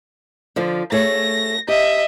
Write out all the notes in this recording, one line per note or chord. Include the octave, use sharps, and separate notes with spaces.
D3 F3 C5
A3 G#4 C#5 A#6
G4 D#5 E5